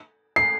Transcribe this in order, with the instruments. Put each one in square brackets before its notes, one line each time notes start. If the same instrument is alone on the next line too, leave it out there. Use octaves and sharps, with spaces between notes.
[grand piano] C7